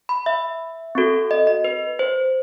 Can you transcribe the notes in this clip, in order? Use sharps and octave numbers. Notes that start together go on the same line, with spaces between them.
B5
E5
C4 F#4 A4
D#5
D#5
B4
C5